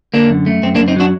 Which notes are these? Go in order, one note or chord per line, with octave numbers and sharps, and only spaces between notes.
D3 A#3 D4
F#2
A3
F#2 C4
A#3 D4
F#2
C4 D#4
F#3 D4 F#4